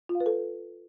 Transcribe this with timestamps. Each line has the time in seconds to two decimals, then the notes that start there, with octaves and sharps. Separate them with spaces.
0.09 F4
0.15 F5
0.20 B4
0.26 A4